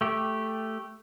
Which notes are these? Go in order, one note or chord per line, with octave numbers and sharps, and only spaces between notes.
A3 G4